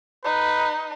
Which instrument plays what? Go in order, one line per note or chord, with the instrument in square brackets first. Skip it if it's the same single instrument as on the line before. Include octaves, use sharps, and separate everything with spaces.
[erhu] D#4 [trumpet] B4